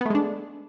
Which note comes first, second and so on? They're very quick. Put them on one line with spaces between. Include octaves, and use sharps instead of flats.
B3 A3 G#3 D4